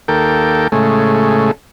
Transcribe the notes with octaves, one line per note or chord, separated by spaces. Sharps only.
D#2 A#3 A4 G5
A2 C#3 G#3 A3